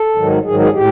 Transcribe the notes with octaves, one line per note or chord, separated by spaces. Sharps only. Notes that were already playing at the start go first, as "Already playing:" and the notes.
Already playing: A4
G#2 D#3 F#3
G#2 D#3 F#3 G#4
G#4
A2 G4